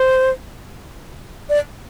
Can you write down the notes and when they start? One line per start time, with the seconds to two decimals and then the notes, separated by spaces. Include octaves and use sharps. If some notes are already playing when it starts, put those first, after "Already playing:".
Already playing: C5
1.49 D5